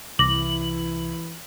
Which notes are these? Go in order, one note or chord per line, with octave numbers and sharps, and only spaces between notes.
C2 E3 E4 D6 A#6 F#7